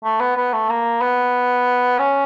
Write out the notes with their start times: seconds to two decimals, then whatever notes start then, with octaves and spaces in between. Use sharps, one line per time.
0.04 A3
0.20 B3
0.37 B3
0.53 A3
0.69 A#3
1.01 B3
1.99 C#4